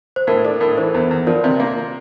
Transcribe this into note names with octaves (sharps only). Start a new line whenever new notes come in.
C5
A2 A#4
D4 A4
A2 A#4
E3 C5
E2
E2
F3 A#4 D5
C3
A#3